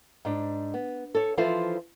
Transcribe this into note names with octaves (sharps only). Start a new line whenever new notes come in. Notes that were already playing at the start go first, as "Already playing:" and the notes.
G#2 D4
B3
A4 C#5
E3 F3 E4 F4 A4 C5